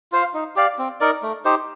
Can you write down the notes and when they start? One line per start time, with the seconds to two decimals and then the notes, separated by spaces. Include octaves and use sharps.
0.12 F4 C5 F5
0.34 D#4
0.56 G4 D5 F5
0.78 C4
1.00 D#4 A#4 D5
1.23 A3
1.45 D#4 G4 C5